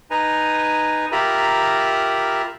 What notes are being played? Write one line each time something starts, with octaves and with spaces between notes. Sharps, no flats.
D#4 B4 G#5 A#5
F4 G4 A#4 E5 A#5 B5